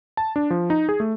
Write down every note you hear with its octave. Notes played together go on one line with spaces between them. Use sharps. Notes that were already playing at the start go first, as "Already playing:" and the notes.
A5
D4
F3
D#4
G#4
A3